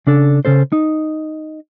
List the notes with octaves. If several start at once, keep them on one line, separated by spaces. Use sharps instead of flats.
C#3 D4 A4
C#3 C#4 A4 C5
D#4